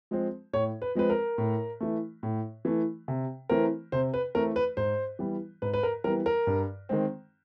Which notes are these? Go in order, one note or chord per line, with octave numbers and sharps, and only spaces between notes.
F3 G#3 C4
A2 C#5
B4
F3 G#3 C4 B4
A#4
A2
E3 A3
A2
E3 A3
C3
E3 A3 C4 A#4
C3 C5
B4
E3 A3 C4 A#4
B4
G#2 C5
E3 G3 B3
G#2 B4
B4
A#4
E3 G3 B3 A#4
A#4
G2
D#3 G#3 C4